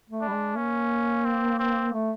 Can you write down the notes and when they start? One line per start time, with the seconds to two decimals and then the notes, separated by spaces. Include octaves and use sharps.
0.10 A3
0.21 D4
0.28 G3
0.32 G#3
0.56 A#3 C#4
1.25 C4
1.59 C4
1.93 A3